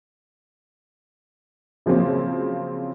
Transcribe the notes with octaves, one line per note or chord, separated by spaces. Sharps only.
C#3 F3 F#3 A#3 C4 C#4